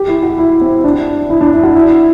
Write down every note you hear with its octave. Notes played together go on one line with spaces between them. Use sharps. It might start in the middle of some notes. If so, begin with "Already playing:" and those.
Already playing: G4
E4
F#4
E4
C4
D4
E4
D4
E4
F#4
E4